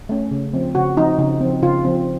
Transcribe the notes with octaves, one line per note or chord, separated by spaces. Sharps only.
A3 C#4
C#3
F3 C4
C#3 F#4
F3 C4 D#4
C#3 D#4
F3 C4
C#3 F4
F3 C4